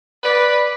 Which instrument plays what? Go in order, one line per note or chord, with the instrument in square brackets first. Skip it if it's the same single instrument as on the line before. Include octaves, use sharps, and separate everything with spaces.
[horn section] B4 D5